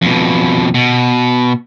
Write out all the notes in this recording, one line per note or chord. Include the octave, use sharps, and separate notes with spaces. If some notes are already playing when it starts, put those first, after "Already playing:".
F2 B2
B2